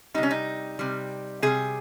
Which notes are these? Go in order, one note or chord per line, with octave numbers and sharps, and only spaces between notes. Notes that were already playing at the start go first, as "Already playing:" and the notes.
C3 G3 D#4
C#4
D#4
C3 G3
C3 G3 G#4